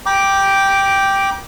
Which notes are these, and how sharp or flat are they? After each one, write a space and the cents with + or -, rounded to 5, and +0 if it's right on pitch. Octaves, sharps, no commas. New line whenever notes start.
G5 +0 A#5 +45 D6 +0